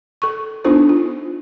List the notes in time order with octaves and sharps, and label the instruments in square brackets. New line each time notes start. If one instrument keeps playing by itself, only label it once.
[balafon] A4 C#6
B3 D4 D#4 F4 A4 C5
F4